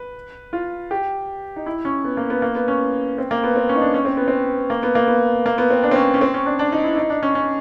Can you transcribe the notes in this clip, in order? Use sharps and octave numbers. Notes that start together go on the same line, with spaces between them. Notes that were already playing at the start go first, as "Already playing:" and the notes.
Already playing: B4
F4
G4
D#4
E4
C#4
B3
A#3
B3
A#3
B3
C#4
C4
A#3
B3
C4
C#4
D#4
D4
C#4
C4
B3
C4
A#3
B3
A#3
B3
A#3
B3
C4
D4
C4
C#4
C#4
C4
C#4
D4
D4
D#4
E4
D#4
D4
C#4
C#4